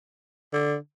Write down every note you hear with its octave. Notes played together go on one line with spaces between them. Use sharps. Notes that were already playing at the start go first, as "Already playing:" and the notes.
D3